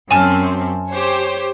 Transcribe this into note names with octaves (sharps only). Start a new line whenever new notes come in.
F#2 C4 G#5 A5 F6
G4 C5 C#5